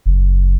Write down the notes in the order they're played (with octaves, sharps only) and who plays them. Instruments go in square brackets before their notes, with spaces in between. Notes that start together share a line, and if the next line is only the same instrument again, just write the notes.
[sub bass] F#1